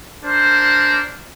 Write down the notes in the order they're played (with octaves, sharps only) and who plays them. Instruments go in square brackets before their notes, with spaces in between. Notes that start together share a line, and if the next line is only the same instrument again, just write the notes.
[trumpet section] D4 A#4 C5